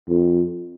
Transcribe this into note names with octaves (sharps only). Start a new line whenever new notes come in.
F2